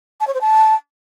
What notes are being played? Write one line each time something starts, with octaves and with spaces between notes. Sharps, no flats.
A5
C#5
C5
A5